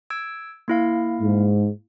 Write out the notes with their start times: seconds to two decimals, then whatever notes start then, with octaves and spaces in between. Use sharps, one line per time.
0.10 E6 G#6 D7
0.68 A#3 E4 F5
1.21 G#2